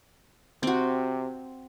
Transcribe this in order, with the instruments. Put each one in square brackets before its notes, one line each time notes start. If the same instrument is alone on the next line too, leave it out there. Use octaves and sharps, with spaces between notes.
[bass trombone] C3 [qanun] C4 F#4